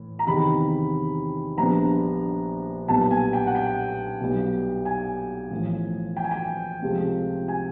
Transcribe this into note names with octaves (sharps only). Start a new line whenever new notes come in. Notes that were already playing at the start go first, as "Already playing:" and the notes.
Already playing: A2 E3
A#5
E2 C3 D#3 B5
A#1 A#2 G3 B3 D4 A#5
B1 A#2 G3 B3 A5
G#5
G5
F#5
G5
B1 B2 G3 B3
G#5
A1 A2 F3
G5
G#5
G5
C#2 C3 F3 A3
G#5